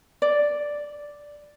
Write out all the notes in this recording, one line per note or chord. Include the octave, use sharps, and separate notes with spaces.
D5